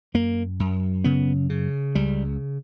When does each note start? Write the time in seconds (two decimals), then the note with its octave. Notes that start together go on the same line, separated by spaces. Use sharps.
0.14 F#2 A#3
0.60 F#2
1.04 C#3 B3
1.50 C#3
1.95 C#2 G3